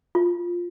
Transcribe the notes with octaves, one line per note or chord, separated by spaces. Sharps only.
F4